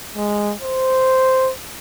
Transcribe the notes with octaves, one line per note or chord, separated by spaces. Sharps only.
G#3
C5